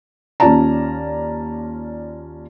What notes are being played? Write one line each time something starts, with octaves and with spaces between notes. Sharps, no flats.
D#2 C#4 F4 D5 A5 A#5